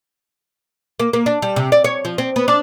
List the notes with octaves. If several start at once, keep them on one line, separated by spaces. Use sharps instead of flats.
A#3
A#3
D4
G3
C3
D5
C#5
F3
C4
B3
D4